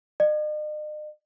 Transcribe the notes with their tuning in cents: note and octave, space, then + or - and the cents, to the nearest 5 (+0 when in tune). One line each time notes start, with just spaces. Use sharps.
D#5 -45